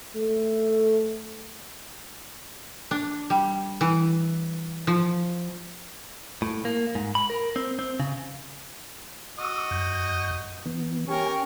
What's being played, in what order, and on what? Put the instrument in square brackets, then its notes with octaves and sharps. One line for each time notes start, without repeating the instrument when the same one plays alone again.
[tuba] A3
[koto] D4
G3
E3
F3
[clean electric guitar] A2
A#3
G#2
B5
A#4
C4
C4
C#3
[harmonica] F#4 D#5 [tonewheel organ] D6 E6
[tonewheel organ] F#2 G6
E3 B3
[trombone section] C#4 G4 [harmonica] A#4 C#6 [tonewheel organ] G#5